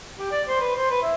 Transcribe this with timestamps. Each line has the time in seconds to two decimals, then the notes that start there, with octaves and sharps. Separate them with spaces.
0.19 G4
0.31 D5
0.48 C5
0.61 B4
0.76 C5
0.90 B4
1.02 E4